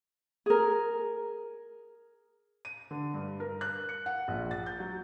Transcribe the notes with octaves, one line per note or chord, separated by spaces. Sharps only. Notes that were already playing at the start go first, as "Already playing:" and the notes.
G#4 A#4
D#7
D3
G2
A#4
F#6
C#7
F#5
A#1
A6
G6
F#3